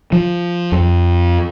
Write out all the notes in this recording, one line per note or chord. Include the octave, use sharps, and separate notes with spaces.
F3
F2